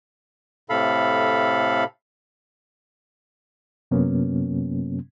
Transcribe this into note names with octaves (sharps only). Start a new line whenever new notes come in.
A2 C3 A4 F5 B5
F#2 C3 F#3 A#3 B3 C#4